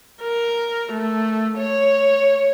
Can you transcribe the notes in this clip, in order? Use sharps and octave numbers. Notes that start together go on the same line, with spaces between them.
A#4
A3
C#5